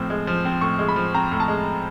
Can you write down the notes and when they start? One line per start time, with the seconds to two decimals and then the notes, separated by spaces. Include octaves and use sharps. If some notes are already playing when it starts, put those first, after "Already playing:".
Already playing: A2 F3 C4
0.10 G#3
0.27 F3
0.45 C4
0.61 A2 C#6
0.79 G#3
0.89 B5
0.96 F3
1.14 C4 A#5
1.32 A2
1.40 A5
1.48 G#3